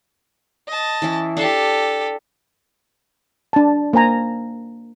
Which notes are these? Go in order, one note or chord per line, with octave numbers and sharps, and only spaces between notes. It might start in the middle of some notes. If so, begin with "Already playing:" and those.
D#5 A5
E3 C#4 E4
D4 G4 A4 F5 A5
D4 A5
A#3 C5 G#5 A#5